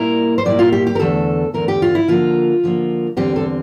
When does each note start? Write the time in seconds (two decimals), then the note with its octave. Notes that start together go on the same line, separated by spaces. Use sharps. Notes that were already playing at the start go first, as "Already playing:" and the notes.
Already playing: A#2 G3 A#3 E4 A#4
0.38 C5
0.45 A#2 G3 A#3 E4 D5
0.59 F4
0.72 G4
0.87 G4
0.95 A#4
0.99 E2 D3 A3 A4
1.54 E2 D3 A3 A#4
1.68 G4
1.82 F4
1.95 E4
2.08 D3 F3 A#3 F4
2.63 D3 F3 A#3
3.17 E2 D3 G3 C4 G4
3.36 A4